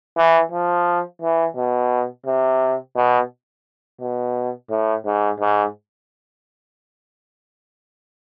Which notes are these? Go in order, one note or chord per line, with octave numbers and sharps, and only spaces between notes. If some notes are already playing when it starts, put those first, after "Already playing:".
E3
F3
E3
B2
C3
B2
B2
A2
G#2
G#2